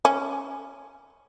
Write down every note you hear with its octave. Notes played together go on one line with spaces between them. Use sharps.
C#4